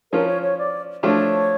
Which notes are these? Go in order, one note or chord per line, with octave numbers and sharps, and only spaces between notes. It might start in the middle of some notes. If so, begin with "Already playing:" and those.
F3 C#4 F4 A#4
C#5
C#5
D5
F3 A3 D4 F4 C#5